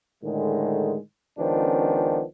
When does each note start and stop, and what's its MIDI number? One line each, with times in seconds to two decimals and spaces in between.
0.23 0.97 45
0.23 0.97 50
0.23 0.97 51
0.23 0.97 56
1.39 2.23 37
1.39 2.23 51
1.39 2.23 53
1.39 2.23 59
1.39 2.23 61
1.39 2.23 62